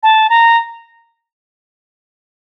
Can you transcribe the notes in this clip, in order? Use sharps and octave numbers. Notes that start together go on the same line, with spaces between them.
A5
A#5